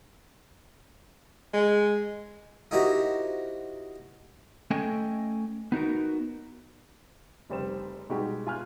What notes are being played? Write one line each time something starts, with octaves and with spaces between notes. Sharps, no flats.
G#3
D#4 E4 F#4 G4 A#4 C5
A3 C#4 A4 D#5 G5 G#5
B3 D#4 F#4 A#4
F1 C#3 G3 C4 C5 E7
B2 G3 G#3 D#4 F#4 G4
F4 G#5 F6 F#6